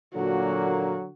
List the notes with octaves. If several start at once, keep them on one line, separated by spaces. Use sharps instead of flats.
A#2 D3 F#3 A#3 F#4